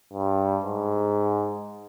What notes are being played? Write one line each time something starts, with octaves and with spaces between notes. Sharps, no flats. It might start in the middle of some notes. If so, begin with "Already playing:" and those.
G2
G#2